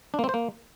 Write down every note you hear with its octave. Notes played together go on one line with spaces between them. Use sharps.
D4
A#3
C4
C5
A#3